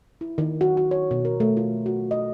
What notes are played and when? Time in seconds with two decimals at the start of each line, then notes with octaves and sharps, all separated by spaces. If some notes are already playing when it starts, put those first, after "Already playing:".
0.21 E4
0.38 D#3
0.61 F#4
0.77 F#4
0.91 C#5
1.11 B2
1.25 A#4
1.40 A3
1.57 F4
1.86 F#4
2.11 D#5